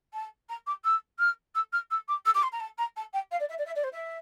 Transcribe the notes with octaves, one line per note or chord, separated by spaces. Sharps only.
A5
A#5
D6
E6
F6
E6
F6
E6
D6
E6
D6
C6
A#5
A5
A#5
A5
G5
F5
D5
E5
D5
E5
D5
C5
E5